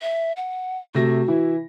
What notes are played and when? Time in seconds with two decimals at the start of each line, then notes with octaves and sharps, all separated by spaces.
0.02 E5
0.37 F#5
0.95 C3 A3 F#4 A#6
1.28 E3 E4